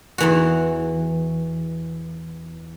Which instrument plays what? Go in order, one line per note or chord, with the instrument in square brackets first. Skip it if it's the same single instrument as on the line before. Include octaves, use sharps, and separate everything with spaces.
[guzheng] E2 E3 F#4